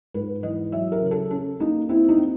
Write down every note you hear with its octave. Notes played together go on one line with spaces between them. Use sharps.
G#2 B4
E3 D#5
F#3 E5
A#4
C#3
A4
C#4 A4
A#3 D#4
C4 E4
D#4
C4